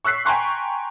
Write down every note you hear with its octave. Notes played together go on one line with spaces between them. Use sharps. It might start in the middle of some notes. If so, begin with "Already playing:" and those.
C#6 E6 F#6 B6 C7
G5 G#5 A#5 C6 C#6 F#6